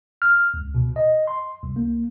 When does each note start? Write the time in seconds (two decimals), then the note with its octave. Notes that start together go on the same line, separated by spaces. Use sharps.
0.22 F6
0.54 C#2
0.75 B2
0.96 D#5
1.27 C6
1.63 C2
1.76 A#3